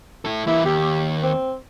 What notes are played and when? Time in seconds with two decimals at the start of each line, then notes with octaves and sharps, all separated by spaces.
0.25 E4 A4
0.47 E3 A#3 E4
0.65 D#2 G4
1.22 C4